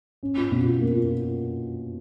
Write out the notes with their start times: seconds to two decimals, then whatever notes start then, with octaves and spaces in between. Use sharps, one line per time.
0.23 C#4
0.37 F4
0.51 B2
0.65 F4
0.80 A#3
0.94 F4